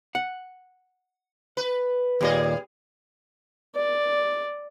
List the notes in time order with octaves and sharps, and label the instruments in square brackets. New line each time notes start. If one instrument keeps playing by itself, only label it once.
[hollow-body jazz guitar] F#5
[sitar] B4
[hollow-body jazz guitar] D#2 A#2 D#5 [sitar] G3 G#4
[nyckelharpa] D5